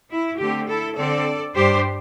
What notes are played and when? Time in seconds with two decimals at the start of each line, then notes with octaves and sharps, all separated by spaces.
0.11 E4
0.39 D3 A3 C4 G4
0.68 E4 A4
0.97 D3 C4 A4 D5
1.56 G2 G3 D4 G4 C5